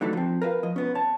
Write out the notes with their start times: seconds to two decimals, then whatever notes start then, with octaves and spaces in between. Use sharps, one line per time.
0.01 D3 E3 F#3 A3 D#4 A4
0.13 F3 C4
0.42 A#4 B4 E5 F5
0.63 F3 D#5
0.76 C2 B3 C#4
0.95 C#5 A5